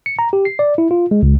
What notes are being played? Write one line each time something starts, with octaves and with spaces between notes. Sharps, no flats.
C#7
A#5
G4
C7
D5
E4
F4
G#3
C#2